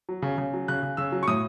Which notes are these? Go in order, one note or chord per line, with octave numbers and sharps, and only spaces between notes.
F#3
C#3
C#3
F#3
C#3 F#6
C#3
C#3 E6
F#3
C#6
A2 D#6